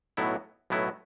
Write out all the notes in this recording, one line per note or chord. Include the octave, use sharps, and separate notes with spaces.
B1 A2 F#3 B3 E4
B1 A2 F#3 B3 E4